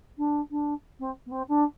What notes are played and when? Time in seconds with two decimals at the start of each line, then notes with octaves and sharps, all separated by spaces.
0.17 D4
0.50 D4
0.99 C4
1.26 B3
1.31 C4
1.48 D4